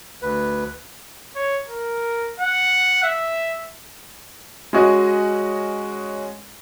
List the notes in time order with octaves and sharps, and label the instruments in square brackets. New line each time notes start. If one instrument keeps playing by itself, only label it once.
[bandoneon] D2 B4
[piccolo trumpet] C#5
A#4
F#5
E5
[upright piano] G#3 C#4 F#4 D#5